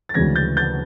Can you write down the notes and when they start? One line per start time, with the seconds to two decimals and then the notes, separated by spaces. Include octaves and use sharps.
0.09 A6
0.14 D2 C#3 E3 G#3 G#6 A#6
0.36 G6 A6
0.57 G6 A6